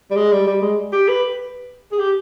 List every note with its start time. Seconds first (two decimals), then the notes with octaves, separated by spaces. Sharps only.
0.11 G3
0.16 G#3
0.32 G3
0.47 G3
0.62 G#3
0.93 G4
1.09 B4
1.92 G#4
1.99 G4